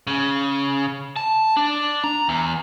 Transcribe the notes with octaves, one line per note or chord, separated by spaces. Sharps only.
C#3
A5
D4
A#5
E2